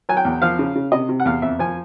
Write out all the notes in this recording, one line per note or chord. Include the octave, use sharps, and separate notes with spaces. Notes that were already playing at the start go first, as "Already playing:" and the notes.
F#3 G#5
G5
E2
F3 F5
C#3
C#3
C3 D#5
C3
F#5
E2 F5
F2 E5
F3 G#5